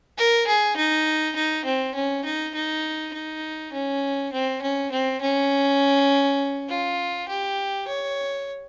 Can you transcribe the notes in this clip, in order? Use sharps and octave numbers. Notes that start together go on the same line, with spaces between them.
A#4
G#4
D#4
D#4
C4
C#4
D#4
D#4
D#4
C#4
C4
C#4
C4
C#4
F4
G4
C#5